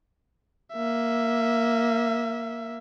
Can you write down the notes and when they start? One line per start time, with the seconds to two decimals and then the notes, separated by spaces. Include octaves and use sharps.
0.73 A#3 E5